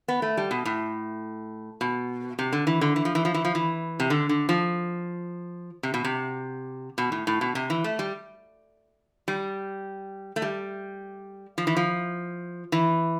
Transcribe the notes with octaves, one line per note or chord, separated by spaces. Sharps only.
B3
A3
G3
B2
A2
B2
C3
D3
E3
D3
E3
F3
E3
F3
E3
F3
E3
C3
D3
D3
F3
C3
B2
C3
B2
A2
A2
B2
C3
E3
A3
G3
G3
A3
G3
F3
E3
F3
E3